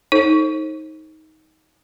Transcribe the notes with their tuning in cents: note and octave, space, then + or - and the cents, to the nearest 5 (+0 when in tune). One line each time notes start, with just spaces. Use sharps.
D#4 +15 A4 +0 C5 +35